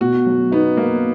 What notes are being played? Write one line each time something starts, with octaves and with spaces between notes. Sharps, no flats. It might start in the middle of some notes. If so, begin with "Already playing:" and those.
B2 F#4
F#3
B3 D#4
A#3 B3